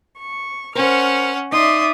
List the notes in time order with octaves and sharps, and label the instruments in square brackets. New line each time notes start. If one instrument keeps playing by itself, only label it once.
[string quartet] C#6
[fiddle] C#4 F#5 [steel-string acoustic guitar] A#4 C5 [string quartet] F6
[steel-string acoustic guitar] D#4 [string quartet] D5 E5 D#6 [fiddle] C6